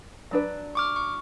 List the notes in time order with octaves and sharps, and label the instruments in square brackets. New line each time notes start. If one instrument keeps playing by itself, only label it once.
[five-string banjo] F#3 D4 B4
[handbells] C#6 D6 F6
C#6